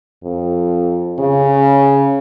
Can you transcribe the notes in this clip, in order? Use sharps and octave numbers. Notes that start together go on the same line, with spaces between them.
F2
C#3